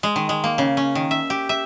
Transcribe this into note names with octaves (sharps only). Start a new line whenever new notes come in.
G#3
D#3
G#3
A#3
C#3
C#4
D#3
E5
G4
E5